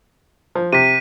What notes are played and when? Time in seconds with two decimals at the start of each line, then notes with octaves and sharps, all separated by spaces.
0.55 F3
0.73 C3 B6 D#7